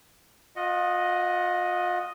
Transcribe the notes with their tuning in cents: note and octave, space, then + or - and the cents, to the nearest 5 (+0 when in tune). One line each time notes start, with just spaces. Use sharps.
F4 +35 D#5 +0 F#5 +0